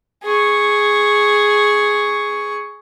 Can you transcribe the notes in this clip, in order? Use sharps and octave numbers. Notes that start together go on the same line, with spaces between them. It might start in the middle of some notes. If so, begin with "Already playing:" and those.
G#4 C#6